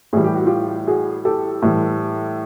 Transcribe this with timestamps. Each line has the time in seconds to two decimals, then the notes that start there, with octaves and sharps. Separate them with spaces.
0.13 A2 E3 G3 G#4
0.24 G4
0.35 F#4
0.46 F4 G4
0.87 F#4 G#4
1.25 G4 A4
1.62 A2 E3 G3